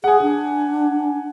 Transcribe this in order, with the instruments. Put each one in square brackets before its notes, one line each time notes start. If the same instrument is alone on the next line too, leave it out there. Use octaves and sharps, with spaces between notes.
[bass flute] G#4 [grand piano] F#5 G#5
[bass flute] D4